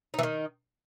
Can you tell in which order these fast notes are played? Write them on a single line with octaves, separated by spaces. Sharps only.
D#4 E3 D#3